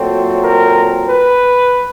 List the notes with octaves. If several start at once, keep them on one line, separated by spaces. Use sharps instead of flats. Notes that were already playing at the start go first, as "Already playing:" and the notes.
Already playing: A#2 F#3 A3 C4
A#4
B4